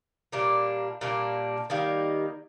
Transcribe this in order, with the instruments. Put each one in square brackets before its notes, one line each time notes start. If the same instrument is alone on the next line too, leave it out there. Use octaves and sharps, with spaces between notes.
[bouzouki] A#2 G3 A#3 D4
A#2 G3 A#3 D4
D#3 G3 A#3